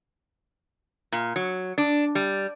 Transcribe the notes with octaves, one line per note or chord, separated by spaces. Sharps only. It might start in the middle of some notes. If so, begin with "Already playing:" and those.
A#2
F#3
D4
G3